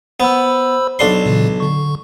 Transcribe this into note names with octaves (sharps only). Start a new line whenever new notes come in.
B3 C5 B5 E6
B1 D4 C6
A#2 C#3 E3
D3 C#6